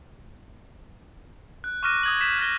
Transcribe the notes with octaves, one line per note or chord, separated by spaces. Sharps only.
F#6
C#6 D6 F6 F#6 A#6 D#7
D#6 G#6 F#7
G6 B6 E7
F#6 A6 A#6 G7